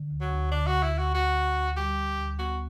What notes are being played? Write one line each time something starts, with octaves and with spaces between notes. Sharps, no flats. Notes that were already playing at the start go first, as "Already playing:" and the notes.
Already playing: D3
D2
F#3
D2
D3 D4
F#4
D2
E4
D2 F#4
D3 F#4
D2
D2
G3 G4
D2
D2
B3 F#4